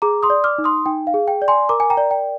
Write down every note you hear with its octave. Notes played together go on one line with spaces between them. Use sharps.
G#4 A#5 D6
C6 D#6
D5
D6 F6
D#4
C6 D#6
D#4 G5
F5
G#4
G5
D5
G#5 C6
A#4 A#5 D6
G#5
G5 A#5
D5
G5